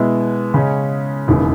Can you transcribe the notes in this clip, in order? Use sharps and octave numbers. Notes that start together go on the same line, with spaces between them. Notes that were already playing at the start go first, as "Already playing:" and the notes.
Already playing: B2 G#3 B3 E4
C#3 G#3 C#4
E1 D#2 C#3 E3